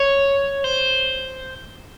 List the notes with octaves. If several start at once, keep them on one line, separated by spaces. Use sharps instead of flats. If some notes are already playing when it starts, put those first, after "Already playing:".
Already playing: C#5
C5